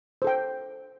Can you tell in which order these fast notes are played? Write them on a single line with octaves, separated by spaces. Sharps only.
C5 A4 G5